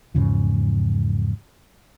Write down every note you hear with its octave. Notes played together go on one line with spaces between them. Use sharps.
E2 G#2 C#3 F3